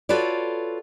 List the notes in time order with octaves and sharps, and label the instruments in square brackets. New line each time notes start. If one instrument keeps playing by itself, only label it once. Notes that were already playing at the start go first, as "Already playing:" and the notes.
[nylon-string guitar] F4 F#4 A4 B4 C#5 D5